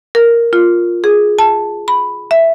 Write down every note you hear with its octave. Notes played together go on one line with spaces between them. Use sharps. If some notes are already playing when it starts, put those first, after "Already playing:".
A#4
F4
G#4
A5
B5
E5